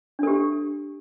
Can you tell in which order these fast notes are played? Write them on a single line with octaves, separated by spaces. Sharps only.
D4 A4 G4